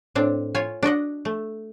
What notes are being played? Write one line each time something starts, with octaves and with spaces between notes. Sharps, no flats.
A2 C4 D4
F4 C#5 G#5
D4 F#4 D#5 F#5
A3